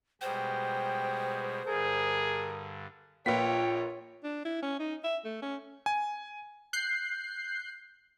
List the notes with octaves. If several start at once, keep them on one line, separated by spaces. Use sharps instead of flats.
B2 G3 G#3 C5 G5
G2 D3 G#4 A#4
A#1 A#3 F4 B4 C#5 G5 B6
D4
E4
C#4
D#4
E5
A3
C#4
G#5
F#6 G6 C7